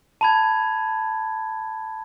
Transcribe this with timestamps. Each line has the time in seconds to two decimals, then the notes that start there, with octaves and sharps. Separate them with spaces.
0.21 A5 B5 G#6